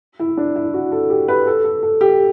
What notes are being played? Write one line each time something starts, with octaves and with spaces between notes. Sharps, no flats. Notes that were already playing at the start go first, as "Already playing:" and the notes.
E4
D4
E4
F#4
A4
G4
B4
A4
A4
A4
G4